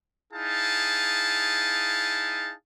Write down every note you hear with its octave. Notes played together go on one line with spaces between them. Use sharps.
D#4 E4 G#4 F5 A5